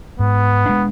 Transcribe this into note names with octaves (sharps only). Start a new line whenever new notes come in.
G#2 B3
G#3 D4